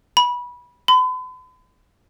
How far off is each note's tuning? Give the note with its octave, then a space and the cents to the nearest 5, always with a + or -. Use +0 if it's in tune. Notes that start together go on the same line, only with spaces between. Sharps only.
B5 -20
B5 +45